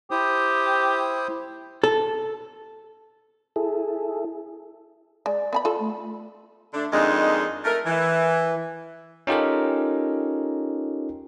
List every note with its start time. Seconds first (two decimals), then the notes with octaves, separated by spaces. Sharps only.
0.11 E4 G4 C5 D#6
1.84 A4
3.56 E4 G#4 A4
5.26 G#3 D5
5.53 B3 G#5 B5
5.65 F4 A4
5.79 A3
6.73 D3 A3 D4
6.92 F2 D#3 G#3 D4 D#4
7.65 A3 A#4
7.86 E3
9.27 C#4 D#4 F4 G4 A4 A#4